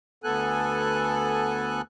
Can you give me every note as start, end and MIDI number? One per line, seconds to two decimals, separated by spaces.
0.24 1.82 38
0.24 1.82 59
0.24 1.82 69
0.24 1.82 80
0.24 1.82 90